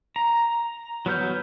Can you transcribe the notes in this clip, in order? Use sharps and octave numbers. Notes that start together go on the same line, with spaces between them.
A#5
F#3 B3 F6 G6